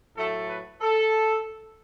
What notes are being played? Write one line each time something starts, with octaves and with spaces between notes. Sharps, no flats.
A2 F#3 A3 A4
B4
A4